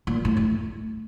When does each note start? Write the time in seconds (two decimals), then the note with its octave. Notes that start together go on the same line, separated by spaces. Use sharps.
0.07 A#2
0.25 A2
0.37 A2